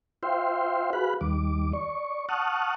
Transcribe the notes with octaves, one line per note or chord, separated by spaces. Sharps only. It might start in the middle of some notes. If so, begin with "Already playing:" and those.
F4 C5 E5 F5 G5 C6
F#4 G#4 B4 F5 B5 F#6
D#2 D#3 G3 D6
D5 C#6
F#5 A5 C#6 D#6 F6 F#6